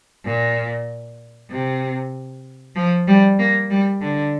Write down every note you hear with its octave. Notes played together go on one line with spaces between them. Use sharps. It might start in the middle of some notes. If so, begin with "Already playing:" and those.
A#2
C3
F3
G3
A#3
G3
D3